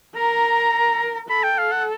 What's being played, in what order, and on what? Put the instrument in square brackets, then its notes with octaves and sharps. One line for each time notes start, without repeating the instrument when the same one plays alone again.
[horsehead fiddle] A#4 [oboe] A#5
[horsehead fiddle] A4 [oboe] B5
[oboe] G5
F5
F#5